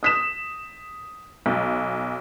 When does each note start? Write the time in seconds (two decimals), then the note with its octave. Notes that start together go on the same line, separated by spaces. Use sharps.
0.03 D#6 B6 E7
1.46 B1